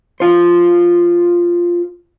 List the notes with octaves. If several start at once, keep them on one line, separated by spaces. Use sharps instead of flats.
F4 C5